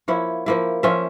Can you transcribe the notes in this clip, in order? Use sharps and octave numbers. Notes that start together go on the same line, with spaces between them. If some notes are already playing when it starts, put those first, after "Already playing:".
F3 A#3 E4 C#5
F3 A#3 E4
F3 C#4 F4 E5